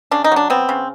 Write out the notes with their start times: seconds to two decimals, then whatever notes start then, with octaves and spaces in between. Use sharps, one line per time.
0.11 C#3 D4
0.24 D#4
0.32 F#3 D4
0.50 B3 C4
0.69 C#3